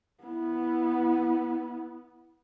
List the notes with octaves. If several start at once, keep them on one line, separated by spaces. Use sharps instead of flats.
B3 E4